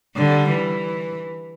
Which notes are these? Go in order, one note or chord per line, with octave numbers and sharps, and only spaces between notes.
D3 G3
E3